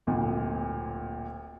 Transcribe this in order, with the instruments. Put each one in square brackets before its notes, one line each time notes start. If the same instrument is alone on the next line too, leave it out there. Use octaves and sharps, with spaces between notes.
[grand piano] D1 G#1 A#2